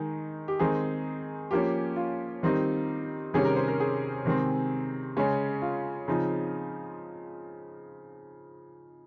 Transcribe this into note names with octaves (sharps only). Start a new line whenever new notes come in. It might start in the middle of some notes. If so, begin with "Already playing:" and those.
Already playing: D#3 G#3 D#4
G4
D#3 G#3 C4 D#4 G#4
F3 A#3 C#4 G4
F4
D#3 G3 C4 D#4
C3 D#3 G3 C#4 G#4
A#4
C5
A#4
G#4
C3 D#3 G#3 C4
C#3 G#3 C#4
F4
C#3 F3 C4 D#4